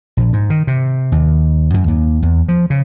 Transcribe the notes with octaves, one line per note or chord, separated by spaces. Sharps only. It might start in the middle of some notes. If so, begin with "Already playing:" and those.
A#1
G#2
D#3
C3
D#2
F#2
D#2
E2
F3
C#3